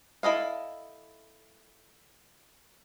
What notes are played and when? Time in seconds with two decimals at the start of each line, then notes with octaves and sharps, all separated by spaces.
0.23 E4 A4 D#5 F5